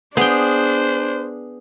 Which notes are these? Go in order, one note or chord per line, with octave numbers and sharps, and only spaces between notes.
B3 D4 G#4 C5 G5